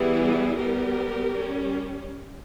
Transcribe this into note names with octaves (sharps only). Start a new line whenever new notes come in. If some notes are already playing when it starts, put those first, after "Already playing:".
Already playing: E3 G3 B3 E4 G#4
G3 B3 G4 A#4
G3 C#4